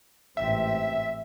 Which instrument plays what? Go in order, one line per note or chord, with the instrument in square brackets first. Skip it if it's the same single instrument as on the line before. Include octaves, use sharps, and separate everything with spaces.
[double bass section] A1 G#2 C4 [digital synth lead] E5